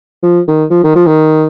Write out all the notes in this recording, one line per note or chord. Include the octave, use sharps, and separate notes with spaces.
F3
D#3
F3
D#3
F3
D#3